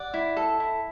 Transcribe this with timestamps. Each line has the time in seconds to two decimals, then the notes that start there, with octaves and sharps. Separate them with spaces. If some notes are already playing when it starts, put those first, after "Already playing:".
Already playing: D5 F#5
0.14 E4
0.37 A4
0.60 E4